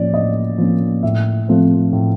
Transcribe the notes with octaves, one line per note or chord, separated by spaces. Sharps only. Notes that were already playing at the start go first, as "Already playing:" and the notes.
Already playing: A2 F3 A#3 C#4 D5
A2 D#5
F3 A#3 C#4
A2 E5
F3 A3 C4
A2